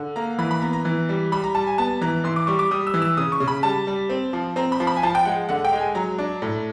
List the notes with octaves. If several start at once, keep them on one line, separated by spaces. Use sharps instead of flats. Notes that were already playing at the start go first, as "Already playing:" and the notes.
Already playing: D3
A#3 A#5
E3 B5
B5
B3 A#5
A#5
E3
G3
G3 B5
A#5
G3 A5
G#5
B3 A5
E3 A#5
E3 C6
D6
G3 C#6
D6
G3 D#6
E6
E3
E6
C#3 D#6
C#6
C#3
B5
G3 A5
G3
C4
F3
C4 A#5
B5
F3
B5
G#5
F3 A5
G5
G#3 F#5
D3 F#5
G5
G#3
G#5
F#3 A#5
D4
A2